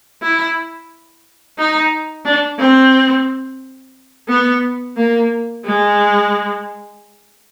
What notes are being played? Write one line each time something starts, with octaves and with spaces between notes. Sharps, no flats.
E4
D#4
D4
C4
B3
A#3
G#3